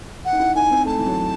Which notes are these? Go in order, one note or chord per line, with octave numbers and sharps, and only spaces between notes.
F#5
D#4
E4
D#4 G#5
C4
A3 A5
E3
F#3